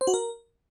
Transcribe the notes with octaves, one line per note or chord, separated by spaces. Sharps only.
C5
F#4
A#4